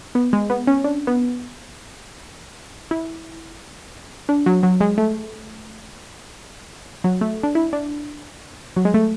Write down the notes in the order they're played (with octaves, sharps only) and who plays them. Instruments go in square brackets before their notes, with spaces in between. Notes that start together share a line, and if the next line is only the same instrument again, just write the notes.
[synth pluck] B3
G#3
B3
C#4
D4
B3
E4
D4
F#3
F#3
G#3
A3
F#3
A3
D4
E4
D4
F#3
G#3
A3